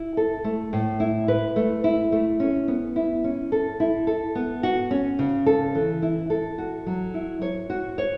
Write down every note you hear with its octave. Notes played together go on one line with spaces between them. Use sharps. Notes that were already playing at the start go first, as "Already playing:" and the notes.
Already playing: E4
A4
A3
A2
E4
B4
A3
E4
A3
C#4
B3
E4
C#4
A4
E4
A4
B3
F#4
C#4
C#3
A4
E3
E4
A4
F#4
F#3
E4
C#5
F#4
C#5